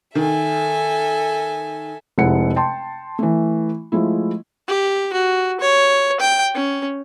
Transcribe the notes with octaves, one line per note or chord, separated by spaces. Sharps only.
D#3 A4 E5 G#5
F1 C3 G#3 E4 F#5 C#7
G5 A5 C6
E3 A3
F3 G#3 A3 E4
G4
F#4
C#5
G5
C#4